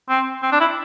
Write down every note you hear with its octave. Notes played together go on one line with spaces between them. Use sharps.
C4
C4
D4
E4